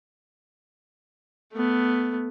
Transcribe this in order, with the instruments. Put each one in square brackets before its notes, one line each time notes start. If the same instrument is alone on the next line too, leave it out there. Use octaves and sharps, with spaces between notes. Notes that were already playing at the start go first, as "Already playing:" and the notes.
[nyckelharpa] A3 B3